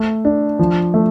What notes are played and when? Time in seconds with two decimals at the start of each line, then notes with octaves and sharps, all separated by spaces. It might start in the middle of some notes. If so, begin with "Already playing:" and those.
Already playing: A3
0.25 D4
0.59 F3
0.94 A3